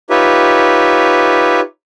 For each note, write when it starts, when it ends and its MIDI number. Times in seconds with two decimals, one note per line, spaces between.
0.10 1.60 63
0.10 1.60 65
0.10 1.60 67
0.10 1.60 71
0.10 1.60 73
0.10 1.60 76